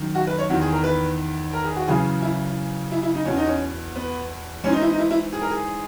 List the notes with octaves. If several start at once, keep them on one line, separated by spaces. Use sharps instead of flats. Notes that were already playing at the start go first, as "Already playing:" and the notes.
Already playing: F#2 D#3
F#4
B4
C#5
E2 D#3 F#4
G#4
A#4
B4
A#4
G#4
F#4
F#2 C#3 E3 G#4
E4
E4
E4
D#4
E2 B2 C#4
D#4
C#4
B3
G#2 E3 C#4
D#4
E4
D#4
E4
E4
G#4
A#4
G#4